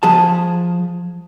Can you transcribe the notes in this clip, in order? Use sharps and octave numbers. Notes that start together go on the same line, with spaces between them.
F3 G#4 A5